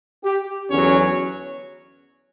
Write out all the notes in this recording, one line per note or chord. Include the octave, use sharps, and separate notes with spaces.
G4
E2 D3 F#3 C#4 C#5